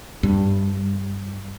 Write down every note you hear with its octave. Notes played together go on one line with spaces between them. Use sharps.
G2